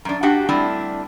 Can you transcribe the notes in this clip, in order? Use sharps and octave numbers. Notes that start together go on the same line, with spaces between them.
F#2 D4
D4 F#4 G4 F#5
G3 A3 C4 D4 E4